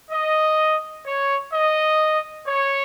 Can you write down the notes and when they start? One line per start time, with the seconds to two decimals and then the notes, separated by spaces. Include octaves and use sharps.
0.11 D#5
1.06 C#5
1.53 D#5
2.48 C#5